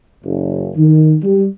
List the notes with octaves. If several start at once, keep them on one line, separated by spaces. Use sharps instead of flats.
F#1
D#3
G3